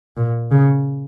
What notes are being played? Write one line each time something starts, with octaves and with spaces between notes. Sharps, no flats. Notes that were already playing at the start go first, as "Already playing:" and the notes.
A#2
C#3